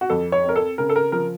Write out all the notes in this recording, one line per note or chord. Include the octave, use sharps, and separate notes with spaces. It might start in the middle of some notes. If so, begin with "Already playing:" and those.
F#4
F2 A4
C#5
C4 A#4
A4
C#3 A#4
A4
A#4
F3 A#4